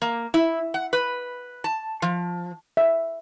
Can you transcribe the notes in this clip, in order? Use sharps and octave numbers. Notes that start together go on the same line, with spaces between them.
A#3
E4
F#5
B4
A5
F3
E5